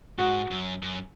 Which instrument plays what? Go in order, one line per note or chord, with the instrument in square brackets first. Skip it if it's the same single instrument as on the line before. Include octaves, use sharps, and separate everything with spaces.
[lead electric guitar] G#2 [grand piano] F#4
[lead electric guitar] F#2
F#2